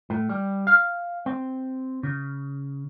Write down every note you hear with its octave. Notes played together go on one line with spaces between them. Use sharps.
A2
G3
F5
C4
C#3